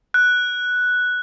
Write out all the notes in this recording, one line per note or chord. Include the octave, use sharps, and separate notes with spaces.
F#6